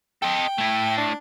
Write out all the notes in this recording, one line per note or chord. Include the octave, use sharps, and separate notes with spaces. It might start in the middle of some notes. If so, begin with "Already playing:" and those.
A4 D#5 G5
A3 E4
D4